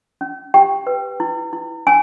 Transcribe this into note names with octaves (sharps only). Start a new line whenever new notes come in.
C#4
G4 G5
B4
E4
E4
C#4 G#5